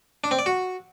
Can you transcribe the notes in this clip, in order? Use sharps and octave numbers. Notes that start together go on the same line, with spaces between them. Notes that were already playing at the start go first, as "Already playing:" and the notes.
D4
C4
D5
F#4